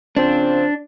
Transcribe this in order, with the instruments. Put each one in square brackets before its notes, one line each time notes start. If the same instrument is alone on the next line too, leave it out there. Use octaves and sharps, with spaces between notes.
[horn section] C#3 F3 C4 [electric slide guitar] D4